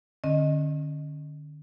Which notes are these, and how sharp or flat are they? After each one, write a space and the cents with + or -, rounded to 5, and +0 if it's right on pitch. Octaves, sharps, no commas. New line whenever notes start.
D3 +30 C#4 -30 D#5 +0